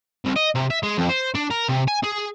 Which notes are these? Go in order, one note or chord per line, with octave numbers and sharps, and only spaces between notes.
C2
D#5
C3
E5
G#3
F2
C5
D4
A#4
C3
G#5
G#4